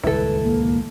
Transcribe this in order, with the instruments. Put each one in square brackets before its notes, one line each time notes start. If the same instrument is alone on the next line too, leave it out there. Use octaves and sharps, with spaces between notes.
[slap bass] D#1 C#2 G2 [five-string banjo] E4 A4 [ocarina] B4
[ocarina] A#3